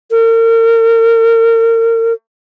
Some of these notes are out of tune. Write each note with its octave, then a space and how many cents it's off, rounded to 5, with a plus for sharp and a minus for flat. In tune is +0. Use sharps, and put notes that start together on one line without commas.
A#4 -35